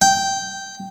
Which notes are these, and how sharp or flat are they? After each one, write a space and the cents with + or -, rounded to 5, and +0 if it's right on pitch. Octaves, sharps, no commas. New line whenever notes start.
G5 -5